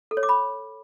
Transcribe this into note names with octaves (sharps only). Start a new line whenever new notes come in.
A4
C#5
D6
B5